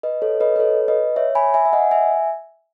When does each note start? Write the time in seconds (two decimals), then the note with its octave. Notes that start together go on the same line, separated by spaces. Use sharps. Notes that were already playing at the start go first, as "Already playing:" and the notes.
0.03 B4 D#5
0.22 A4 C#5
0.40 B4 D#5
0.56 B4
0.59 A4 C#5
0.88 B4 D#5
1.16 C#5 E5
1.35 G#5 B5
1.54 E5 G#5
1.65 E5
1.73 D#5 F#5
1.91 E5 G#5